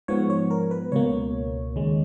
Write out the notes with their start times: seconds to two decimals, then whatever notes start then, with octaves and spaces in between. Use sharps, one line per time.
0.08 G#2 F3 B3 C#5
0.30 C#5
0.51 A#4
0.71 B4
0.92 C#2 B2 A#3 C#5
1.76 D#2 C#3 G#3